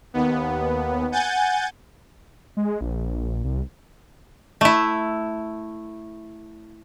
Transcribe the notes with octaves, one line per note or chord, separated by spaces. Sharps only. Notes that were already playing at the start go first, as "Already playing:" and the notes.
D#2 B3
F#5 G#5 G6 A6
G#3
A#1
C2
A3 E4